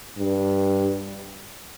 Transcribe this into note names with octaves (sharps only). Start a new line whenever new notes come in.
G2